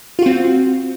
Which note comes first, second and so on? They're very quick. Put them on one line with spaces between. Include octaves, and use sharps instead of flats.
F4 F#4 C4